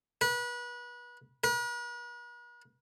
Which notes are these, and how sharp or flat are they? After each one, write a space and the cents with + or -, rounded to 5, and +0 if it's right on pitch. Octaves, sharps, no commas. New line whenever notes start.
B4 -30
B4 -45